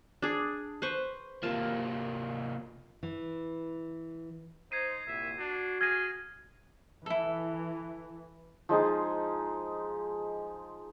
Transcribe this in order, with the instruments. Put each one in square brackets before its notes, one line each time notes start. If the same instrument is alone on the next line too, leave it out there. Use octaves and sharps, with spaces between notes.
[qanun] D4 G#4
B4 C5 C#6
[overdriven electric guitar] C3 A#3 [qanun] F4 A5
[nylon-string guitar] E3
[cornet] D#4 [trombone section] C5 [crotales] G#6 C7 D#7
[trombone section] C2 A#2 [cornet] E5
[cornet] D4 [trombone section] F#4
[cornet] G#4 [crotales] F6 A#6 D#7 [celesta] G#6
[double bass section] E3 [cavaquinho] E4 A4
[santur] F3 G#3 D#4 G#4